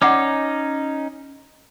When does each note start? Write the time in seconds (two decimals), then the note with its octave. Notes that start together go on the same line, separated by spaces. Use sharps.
0.02 C#4 D#4 D5 F#5 D6